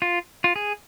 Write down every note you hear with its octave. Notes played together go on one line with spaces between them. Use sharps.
F4
F4
G#4